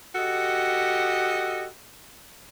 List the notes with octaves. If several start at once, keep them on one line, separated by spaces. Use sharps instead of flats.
F#4 G4 A4 D#5